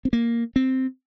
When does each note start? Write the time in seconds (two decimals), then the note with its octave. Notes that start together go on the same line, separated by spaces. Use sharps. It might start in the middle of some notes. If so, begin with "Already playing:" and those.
0.05 C4
0.13 A#3
0.56 C4